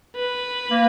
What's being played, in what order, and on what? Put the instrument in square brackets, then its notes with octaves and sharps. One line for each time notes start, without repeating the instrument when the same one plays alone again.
[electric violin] B4
[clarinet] A#3